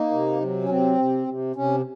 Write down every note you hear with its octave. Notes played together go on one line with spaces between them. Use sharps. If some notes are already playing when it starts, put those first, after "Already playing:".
Already playing: A#3 D#4
C3
F#3
C#4
C3 C4
C3
C3
C3 C#4